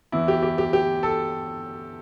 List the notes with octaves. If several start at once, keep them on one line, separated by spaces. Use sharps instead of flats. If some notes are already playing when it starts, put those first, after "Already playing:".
E2 E3 E4
G4
G4
G4
G4
A4